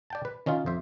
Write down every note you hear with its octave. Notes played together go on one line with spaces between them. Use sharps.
D5 G5 A5
B4
D#3 C#4 D#4 F4
F2 C5 E5